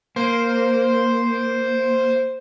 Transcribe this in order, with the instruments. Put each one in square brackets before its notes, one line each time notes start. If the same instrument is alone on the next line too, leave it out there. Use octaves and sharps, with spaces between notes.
[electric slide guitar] A#3 [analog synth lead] C5